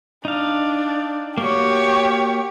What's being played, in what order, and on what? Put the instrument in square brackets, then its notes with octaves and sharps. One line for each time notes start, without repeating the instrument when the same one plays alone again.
[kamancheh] D4 [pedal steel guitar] D#4 F5
[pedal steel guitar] A#3 F#4 [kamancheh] G4 C#5